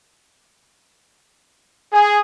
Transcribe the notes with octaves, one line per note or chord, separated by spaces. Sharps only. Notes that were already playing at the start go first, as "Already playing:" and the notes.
G#4